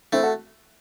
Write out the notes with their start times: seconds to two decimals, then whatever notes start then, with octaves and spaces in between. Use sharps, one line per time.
0.12 A3 C4 E4
0.23 F#4 A4